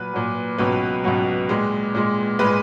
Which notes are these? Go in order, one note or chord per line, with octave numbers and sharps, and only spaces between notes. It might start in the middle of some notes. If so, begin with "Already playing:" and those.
Already playing: A#2 F#3 B4
A#2 F#3
C#2 B2 F#3 B4
C#2 B2 F#3
A#2 G#3
A#2 G#3
A#2 G#3 B4